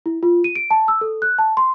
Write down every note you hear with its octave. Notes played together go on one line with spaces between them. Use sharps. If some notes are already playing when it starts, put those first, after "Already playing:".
E4
F4
D#7
D7
A5
E6
A4
F#6
A5
C6